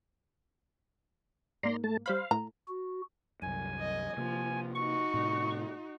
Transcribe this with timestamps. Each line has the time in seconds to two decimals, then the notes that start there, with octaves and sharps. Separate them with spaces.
1.63 G#2 A#3 D5 A#5 C6
1.84 A3 A5
2.06 G3 C5 F5 B5
2.31 A2 A#5
2.68 F#4
3.42 C2 F#2 G#5
3.79 D#5
4.17 C3 F3 A#3
4.75 D#4 F#4 C#6
5.14 A2 C3